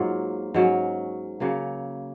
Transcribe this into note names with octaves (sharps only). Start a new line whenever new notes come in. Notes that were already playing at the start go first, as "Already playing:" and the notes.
Already playing: G#2 F#3 A#3 F4
G#2 F#3 C#4
C#3 F#3 A#3